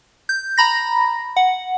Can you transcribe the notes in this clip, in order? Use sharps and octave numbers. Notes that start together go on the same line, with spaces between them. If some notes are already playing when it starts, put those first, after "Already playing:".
G6
A#5 B5 A#6
F#5